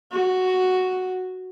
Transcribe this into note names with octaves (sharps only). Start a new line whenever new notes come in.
F#4